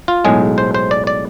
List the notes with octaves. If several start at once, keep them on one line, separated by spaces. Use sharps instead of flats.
F4
B1 A2 G#3 G#4
C5
C5
D5
D5